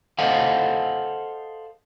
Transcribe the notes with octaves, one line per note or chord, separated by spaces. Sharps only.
A4 C5 D#5 F5 F#5